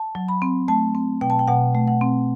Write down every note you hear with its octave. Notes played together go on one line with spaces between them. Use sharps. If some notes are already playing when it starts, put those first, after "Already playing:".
Already playing: A5
F#3
B5
C4
A3 A5
C4
B2 G5
A5
G5
B2 F#5
A3
F#5
C4